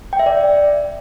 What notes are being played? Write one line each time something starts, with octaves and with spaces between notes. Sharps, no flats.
G5
E5
D5